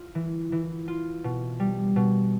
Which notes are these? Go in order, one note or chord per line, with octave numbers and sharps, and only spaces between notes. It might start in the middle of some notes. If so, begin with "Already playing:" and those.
Already playing: F4
E3
E3
F4
B2
G3
B2